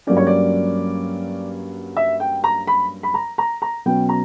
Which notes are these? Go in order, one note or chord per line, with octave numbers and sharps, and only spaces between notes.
G2 F#3 A#3 C#4 D5
C#5
D5
E5
G5
A#5
B5
B5
A#5
A#5
A#5
B2 F#3 C#4 G5
A#5